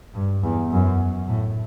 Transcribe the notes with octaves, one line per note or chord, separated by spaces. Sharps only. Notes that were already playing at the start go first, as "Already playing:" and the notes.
G2
E2
F#2
A2